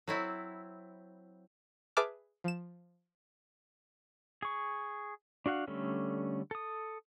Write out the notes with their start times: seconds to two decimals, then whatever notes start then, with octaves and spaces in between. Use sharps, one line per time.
0.07 F#3 C4 E4
1.97 G#4 B4 E5 A5 D6 F6
2.44 F3 E7
4.42 G#4 C#6
5.46 D4 F#4 F5 F#5
5.67 D3 G3 A3 C#4
6.51 A4 D#6